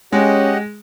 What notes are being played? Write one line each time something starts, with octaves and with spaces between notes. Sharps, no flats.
G#3 C#4 G4 D#5 F#5